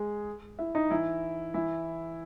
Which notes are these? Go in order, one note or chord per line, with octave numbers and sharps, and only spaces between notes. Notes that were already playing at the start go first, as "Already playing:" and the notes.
Already playing: G#3 G#4
E4 E5
D#4 D#5
E3 E4
E3 E4